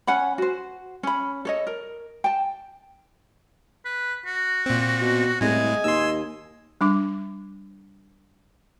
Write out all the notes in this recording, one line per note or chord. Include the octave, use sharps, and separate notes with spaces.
C#4 F#5 G#5 B5
F#4 C5
C#4 B5
A4 C#5 D#5
A#4
G5 A5
B4
F#4
A#2 C4
B2
C2 A2 G#3 D#5 G#5
D#2 C6 E6
G3 D4 D6